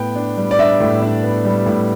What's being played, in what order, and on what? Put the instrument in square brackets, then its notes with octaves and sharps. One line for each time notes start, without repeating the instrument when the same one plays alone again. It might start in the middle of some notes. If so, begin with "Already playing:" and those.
Already playing: [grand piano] A2 B3 G5
D4
G3
D5
D4 E5
A2
D4
B3
G3
A2